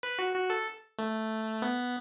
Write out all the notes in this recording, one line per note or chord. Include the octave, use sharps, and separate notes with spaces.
B4
F#4
F#4
A4
A3
B3